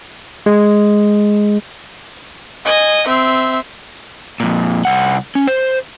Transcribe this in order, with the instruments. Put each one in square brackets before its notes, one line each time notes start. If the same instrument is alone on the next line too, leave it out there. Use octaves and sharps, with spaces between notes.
[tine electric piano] G#3
[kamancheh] D#5 G#5
C4 E5
[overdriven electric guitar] F2 A#2
C2 F#5
C#4
C5